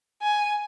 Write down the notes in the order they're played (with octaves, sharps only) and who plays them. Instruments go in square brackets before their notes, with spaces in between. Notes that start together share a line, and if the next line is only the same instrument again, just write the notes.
[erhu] G#5